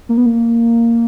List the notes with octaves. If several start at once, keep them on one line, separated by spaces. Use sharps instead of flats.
A#3
B3
A#3